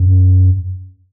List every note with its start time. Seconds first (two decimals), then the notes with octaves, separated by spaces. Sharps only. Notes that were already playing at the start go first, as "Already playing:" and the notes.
Already playing: F#2